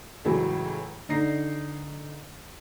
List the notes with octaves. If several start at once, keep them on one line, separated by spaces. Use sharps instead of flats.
C#2 A2 C#3 E3 F#3
D3 D#4 D5 A#6 C7